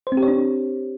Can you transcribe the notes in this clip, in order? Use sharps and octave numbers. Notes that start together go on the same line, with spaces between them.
C5
C4
G4
C#5
D4